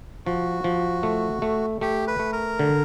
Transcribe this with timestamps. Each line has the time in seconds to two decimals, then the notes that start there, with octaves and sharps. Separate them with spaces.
0.26 F3 F#4
0.64 F3
1.03 A3
1.42 A3
1.81 A3 G4
2.08 B4
2.19 A3
2.33 A#4
2.59 D3